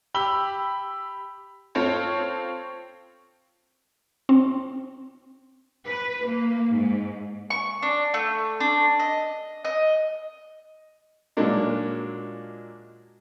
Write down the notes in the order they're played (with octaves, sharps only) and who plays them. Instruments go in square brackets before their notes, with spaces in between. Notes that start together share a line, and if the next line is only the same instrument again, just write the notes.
[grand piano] G4 B5 E6 G7
[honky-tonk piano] C4 F4 A4 C5 C#5
[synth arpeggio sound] C4
[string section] B4
A#3
G#2
[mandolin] C#6
D4
A3
D4
D#5
D#5
[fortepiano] A#2 F#3 G#3 A#3 D4 D#4